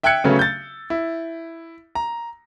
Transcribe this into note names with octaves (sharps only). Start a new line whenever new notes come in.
E5 G5 E6 F#6 G#6 C#7
C#3 F#3 A3 B3 C#4
G6 A6
E4
A#5